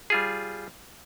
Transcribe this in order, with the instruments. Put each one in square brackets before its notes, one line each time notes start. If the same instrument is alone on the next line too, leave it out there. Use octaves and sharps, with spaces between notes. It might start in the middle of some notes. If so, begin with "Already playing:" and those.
[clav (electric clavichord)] G3 F4 G#4